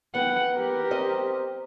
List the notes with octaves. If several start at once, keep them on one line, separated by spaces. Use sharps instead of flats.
B3 F#5 G5
G4 A#4
C4 D#5